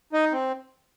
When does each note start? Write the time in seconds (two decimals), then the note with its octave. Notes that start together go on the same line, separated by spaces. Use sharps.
0.13 D#4 D#5
0.32 C4